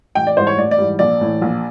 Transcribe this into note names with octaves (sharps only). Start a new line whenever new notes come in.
A1 G5
D5
G#2 E3 G3 C5
C#5
A1 D5
D5
G#2 E3 G3
A#1 D5
A2 E3
A#1